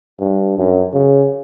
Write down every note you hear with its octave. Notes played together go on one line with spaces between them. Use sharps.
G2
F#2
C#3